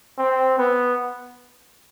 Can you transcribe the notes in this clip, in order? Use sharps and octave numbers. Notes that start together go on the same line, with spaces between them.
C4
B3